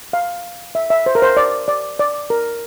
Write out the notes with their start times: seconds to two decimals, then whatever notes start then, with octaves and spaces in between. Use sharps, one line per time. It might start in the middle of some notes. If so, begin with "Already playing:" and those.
0.13 F5
0.75 E5
0.90 E5
1.06 C5
1.15 A#4
1.22 C5
1.37 D5
1.68 D5
1.99 D5
2.30 A#4